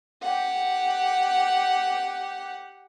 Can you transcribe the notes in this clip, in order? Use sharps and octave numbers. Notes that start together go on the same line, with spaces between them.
G4 F#5